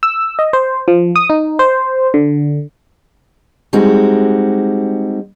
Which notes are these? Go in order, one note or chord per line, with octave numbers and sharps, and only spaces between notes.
E6
D#5
C5
F3
D#6
D#4
C5
D3
G3 G#3 C4 D#4 F#4